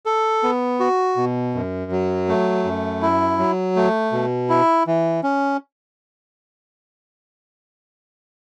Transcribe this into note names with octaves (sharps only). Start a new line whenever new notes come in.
A4
B3
F#4
B2
F#2
F#3
A3
F#2
E4
F#3
A3
B2
E4
E3
C#4